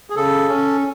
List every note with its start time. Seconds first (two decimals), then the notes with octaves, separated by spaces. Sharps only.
0.10 G#4
0.16 C#3 A4
0.49 C#4